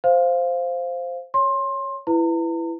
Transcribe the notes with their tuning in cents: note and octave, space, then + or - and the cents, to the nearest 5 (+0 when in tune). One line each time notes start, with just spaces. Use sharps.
C5 +0 F5 +0
C#5 +0 C6 +20
E4 +15 B4 +5 A#5 -40